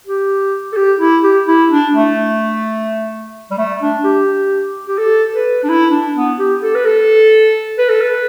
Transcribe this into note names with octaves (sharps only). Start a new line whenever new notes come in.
G4
A4
G4
E4
G4
E4
D4
A3
G3
A3
D4
G4
G4
A4
B4
D4
E4
D4
B3
G4
A4
B4
A4
B4
A4
B4